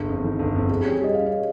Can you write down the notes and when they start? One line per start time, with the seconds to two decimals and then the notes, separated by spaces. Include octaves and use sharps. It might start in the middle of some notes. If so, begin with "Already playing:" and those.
Already playing: G1 G#4
0.08 F2
0.24 D#3
0.39 G1
0.55 F2
0.69 F2 G#4
0.81 C#4 G4
0.92 G#4
1.00 G3 D#5
1.14 C#4 F5
1.26 D#5